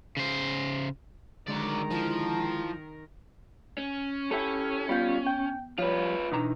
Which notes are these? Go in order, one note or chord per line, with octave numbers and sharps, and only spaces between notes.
C#3 C5
D3 D#3 F#3 G#3 A#4 D5
F3 E4
C#4
C#4 E4 G4 A4
G3 B3 F4 G6
G5
F3 G3 F4 B4 C#5
B2 E3 D4 D#4 A#5